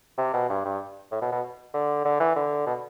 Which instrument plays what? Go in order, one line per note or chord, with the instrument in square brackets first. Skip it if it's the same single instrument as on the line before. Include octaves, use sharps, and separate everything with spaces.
[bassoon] C3
B2
G2
G2
A2
B2
B2
D3
D3
E3
D3
B2